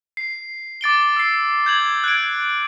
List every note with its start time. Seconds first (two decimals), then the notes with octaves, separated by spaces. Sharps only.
0.17 C7
0.81 D6 A6 D7 G7
1.16 E6 C7
1.66 G6 G#6 F#7
2.04 F#6 G#6 D7